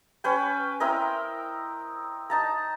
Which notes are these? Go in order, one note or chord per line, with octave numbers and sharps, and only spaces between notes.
C#4 B4 G5
C4 E4 A#4 D#5
D#4 A5 A#5